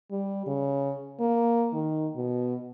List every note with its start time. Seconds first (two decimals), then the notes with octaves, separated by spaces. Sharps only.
0.11 G3
0.47 C#3
1.20 A#3
1.73 D#3
2.16 B2